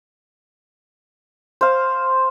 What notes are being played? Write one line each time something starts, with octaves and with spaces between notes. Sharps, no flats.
C5 F5